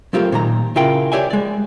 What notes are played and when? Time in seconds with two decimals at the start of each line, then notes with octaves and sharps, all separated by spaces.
0.13 F#3 A3 C4 F4 G4 A#4
0.32 A#2 D#3 A#5
0.76 C#3 E4 F4 A#4 G5
1.12 G4 C#5 D5 E5 G5 G#5
1.30 G#3 D5